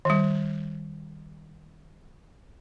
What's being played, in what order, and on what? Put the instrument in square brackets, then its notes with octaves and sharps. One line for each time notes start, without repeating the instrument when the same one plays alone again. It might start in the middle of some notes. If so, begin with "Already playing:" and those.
[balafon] D#3 G3